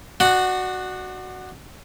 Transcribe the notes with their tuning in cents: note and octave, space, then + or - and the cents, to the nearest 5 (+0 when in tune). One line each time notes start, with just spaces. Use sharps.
D4 +35 F#4 +0 F#5 +0